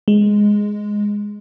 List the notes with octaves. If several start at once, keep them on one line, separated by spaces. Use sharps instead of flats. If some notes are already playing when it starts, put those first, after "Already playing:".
G#3